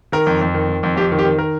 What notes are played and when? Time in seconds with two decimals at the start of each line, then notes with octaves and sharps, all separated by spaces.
0.12 D#3 A#4
0.26 F2
0.41 F2
0.54 D#3
0.69 D#3
0.83 F2
0.96 F2 G4
1.12 D#3
1.19 G4
1.25 D#3
1.39 A#4